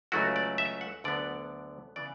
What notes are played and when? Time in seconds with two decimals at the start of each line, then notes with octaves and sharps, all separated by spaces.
0.12 C#2 C#3 F#3 A3 E4 F#4
0.36 D5
0.58 E5
0.81 F#5
1.04 D2 D3 F#3 B3 D4 D5
1.96 C#3 E3 B3 D5